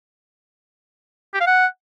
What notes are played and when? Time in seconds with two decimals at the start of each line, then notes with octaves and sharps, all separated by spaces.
1.34 G4
1.40 F5
1.47 F#5